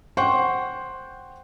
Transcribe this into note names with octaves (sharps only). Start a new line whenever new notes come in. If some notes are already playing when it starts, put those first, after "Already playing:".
C5 F#5 G5 C6 C#6